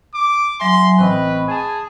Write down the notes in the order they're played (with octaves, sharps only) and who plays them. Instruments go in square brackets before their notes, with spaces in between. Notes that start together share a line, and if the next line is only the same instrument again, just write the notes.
[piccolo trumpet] D6
[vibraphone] F#3 E5 G#5 [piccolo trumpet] C6
[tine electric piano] A1 C4 D#5 [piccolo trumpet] B4 [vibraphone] B5 C#6
[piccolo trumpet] G#4 [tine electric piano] G#5 A5